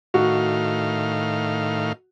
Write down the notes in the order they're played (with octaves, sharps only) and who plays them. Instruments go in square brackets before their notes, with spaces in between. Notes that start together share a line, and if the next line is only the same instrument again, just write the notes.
[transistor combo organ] A2 D#3 F5 [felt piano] F#4